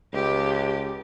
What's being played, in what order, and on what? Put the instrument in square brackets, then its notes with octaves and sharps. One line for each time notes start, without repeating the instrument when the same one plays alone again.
[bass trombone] C#2 [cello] G4